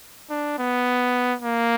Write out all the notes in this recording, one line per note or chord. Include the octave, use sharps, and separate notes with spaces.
D4
B3
A#3